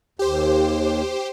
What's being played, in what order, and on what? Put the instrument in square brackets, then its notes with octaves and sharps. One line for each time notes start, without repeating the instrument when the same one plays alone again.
[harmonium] D#2 [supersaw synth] G4 C5